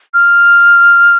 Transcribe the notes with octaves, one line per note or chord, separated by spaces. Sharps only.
F6